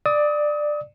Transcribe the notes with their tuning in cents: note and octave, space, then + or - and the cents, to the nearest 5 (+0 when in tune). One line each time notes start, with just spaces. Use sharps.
D5 +15 D#6 +35